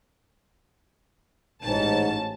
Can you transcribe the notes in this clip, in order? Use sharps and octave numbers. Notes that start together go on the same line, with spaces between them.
A1 G#2 C#4 A5